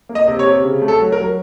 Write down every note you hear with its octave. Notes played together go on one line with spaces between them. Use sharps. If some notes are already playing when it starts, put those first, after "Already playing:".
A#3
D#5
C3
C#5
C3
C#3
A3
A4
F#3
A#4
F#3